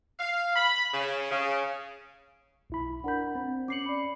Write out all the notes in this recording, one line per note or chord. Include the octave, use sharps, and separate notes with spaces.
F5
B5
C#3
C#3
B1 E4 B5
D4 A#4 F#5 B5 G6
C4
C#4 D6 C7 C#7 F#7
D5 B5